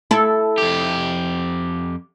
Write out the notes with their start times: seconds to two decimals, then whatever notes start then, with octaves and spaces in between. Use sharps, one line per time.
0.11 E4 A4
0.58 F2 G4